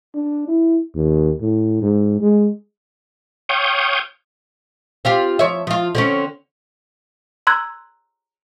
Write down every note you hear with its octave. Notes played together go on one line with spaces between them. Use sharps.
D4
E4
D#2
A2
G#2
G#3
C#5 F5 G5 C#6 D#6 G6
C4 F4 G4
F3 C#5 E5
F3 F4
D3 C4 C#4
A#5 C6 E6 F#6 G#6